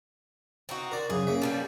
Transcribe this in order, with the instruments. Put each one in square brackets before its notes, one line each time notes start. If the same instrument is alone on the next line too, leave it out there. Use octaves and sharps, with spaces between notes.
[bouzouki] C4 D#4 F#4
[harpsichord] A#4 D5
[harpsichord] F#2 C#3 [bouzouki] G#4
[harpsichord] A#3 C#4 E5
[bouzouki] B2 D3 G3